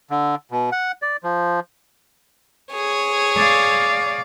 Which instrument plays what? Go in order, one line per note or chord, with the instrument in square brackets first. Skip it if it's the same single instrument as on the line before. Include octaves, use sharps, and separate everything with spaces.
[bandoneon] D3
B2
F#5
D5
F3
[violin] G#4 C#5
[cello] D5 F5